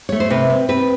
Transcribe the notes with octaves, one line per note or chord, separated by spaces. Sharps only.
A3 C#5
C5
C3 B4
C4
C4 B4